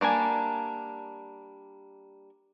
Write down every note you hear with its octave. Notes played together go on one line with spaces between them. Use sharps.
G3 A#3 D4 G#5